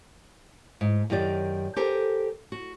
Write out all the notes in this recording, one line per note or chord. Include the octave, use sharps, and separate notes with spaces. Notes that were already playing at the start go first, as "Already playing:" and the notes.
G#2
F#2 D#3 G4 D5
G4 A4 A#4 C5 G#5
F#4